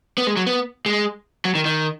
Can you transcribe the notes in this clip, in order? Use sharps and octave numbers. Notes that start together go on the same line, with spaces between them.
B3
G#3
F#3
B3
G#3
F#3
D#3
D#3